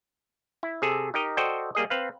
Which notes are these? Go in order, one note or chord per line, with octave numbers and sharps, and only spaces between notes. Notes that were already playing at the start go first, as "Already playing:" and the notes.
E4
C3 G#4 A4
D#4 G4 A#4 D#5
F#4 A4 C5 D5 D#5 G5
G3 A#3 G#4 D#5
C4 B4 F5